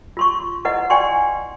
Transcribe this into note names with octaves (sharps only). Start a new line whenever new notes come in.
F4 C6 C#6
E4 B4 D#5 F#5
D5 G5 G#5 C6 C#6